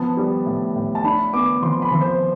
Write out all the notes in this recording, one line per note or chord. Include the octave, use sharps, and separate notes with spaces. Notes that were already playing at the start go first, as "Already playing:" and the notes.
Already playing: F3 B3 A5
G3
A2
A2
A5
D4 B5
B3 D6
F3 C6
B5
F3
C5